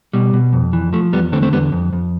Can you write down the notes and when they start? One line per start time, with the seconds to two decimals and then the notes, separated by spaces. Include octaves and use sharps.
0.13 B2 G3
0.33 B2
0.53 F2
0.73 E3
0.93 F3 A3
1.13 E2 G3 B3
1.32 D3 A3 C4
1.42 A3 C4
1.53 E2 G3 B3
1.72 F2
1.93 F2